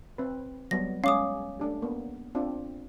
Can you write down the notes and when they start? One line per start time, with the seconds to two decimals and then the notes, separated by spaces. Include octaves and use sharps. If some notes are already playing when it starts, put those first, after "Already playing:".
0.18 C4 B4
0.71 F#3 G3 B3 A#6
1.04 G#3 C#4 F5 D6 D#6
1.59 A3 D4 G4
1.82 A#3 B3
2.35 C4 D4 F4